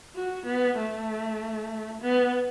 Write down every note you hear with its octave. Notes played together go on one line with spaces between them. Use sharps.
F#4
B3
A3
B3